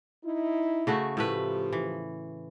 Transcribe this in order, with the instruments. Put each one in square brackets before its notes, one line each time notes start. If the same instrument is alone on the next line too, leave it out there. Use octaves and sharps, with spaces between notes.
[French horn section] D#4 E4
[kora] C#3 A3 F#4
[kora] A2 A3 B4 [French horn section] F3 G4
[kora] E3